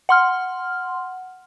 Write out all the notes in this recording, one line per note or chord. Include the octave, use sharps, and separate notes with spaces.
F#5 C6 F6